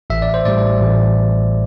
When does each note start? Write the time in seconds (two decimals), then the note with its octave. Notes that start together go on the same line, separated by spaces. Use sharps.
0.10 A1 E5
0.22 D5
0.34 C5
0.45 A2 G3 D5
0.81 A1